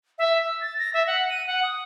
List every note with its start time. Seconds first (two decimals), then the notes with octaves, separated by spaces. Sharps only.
0.18 E5
0.45 E6
0.61 A6
0.79 A#6
0.94 E5
1.07 F#5
1.30 D#7
1.47 F#5
1.63 D#6